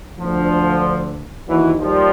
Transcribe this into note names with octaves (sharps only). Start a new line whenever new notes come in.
D2 D3 F3
D#2 D#3 E3 F#3
F3 G3